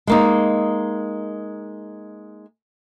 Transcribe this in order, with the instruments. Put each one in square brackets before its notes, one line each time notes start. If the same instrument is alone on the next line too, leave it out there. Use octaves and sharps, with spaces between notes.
[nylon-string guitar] G#3 A#3 D#4